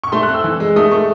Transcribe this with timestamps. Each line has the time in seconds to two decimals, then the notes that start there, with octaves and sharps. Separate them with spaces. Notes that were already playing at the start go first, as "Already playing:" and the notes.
0.04 C#6
0.12 A3 C6
0.23 F#6
0.28 C4
0.34 E6
0.44 E3
0.60 G#3
0.76 A3 D#6
0.91 A3 C#6